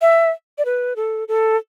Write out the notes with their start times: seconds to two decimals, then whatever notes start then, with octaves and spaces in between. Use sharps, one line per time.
0.02 E5
0.58 D5
0.65 B4
0.96 A4
1.28 A4